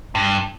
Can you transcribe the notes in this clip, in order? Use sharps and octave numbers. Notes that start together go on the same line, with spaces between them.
G2